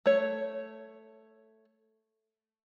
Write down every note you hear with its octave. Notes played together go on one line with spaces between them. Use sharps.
A3 C#5